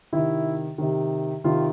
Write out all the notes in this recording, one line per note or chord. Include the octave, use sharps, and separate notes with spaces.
C3 D#3 E4
C3 D#3
C3 D#3 F4